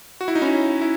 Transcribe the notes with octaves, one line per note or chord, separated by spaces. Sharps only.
F#4
E4
D#4
C#4 E4
E4